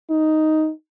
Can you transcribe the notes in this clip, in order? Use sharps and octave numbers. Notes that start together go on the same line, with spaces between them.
D#4